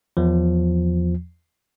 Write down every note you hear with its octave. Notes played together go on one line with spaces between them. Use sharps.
E2 F3